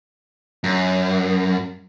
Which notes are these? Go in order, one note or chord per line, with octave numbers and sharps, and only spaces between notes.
F#2